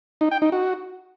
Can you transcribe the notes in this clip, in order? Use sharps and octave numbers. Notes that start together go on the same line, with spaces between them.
D#4
G5
D#4
F#4